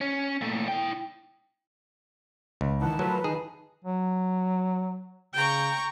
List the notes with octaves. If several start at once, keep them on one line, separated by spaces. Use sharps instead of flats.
C#4
A#2 A3
E4 G5
C#2
D#3 E3 F#5 A5
F3 F#3 A3 A#4 B4
D#3 D#4 G#4
F#3
C#3 G5 A#5 C#6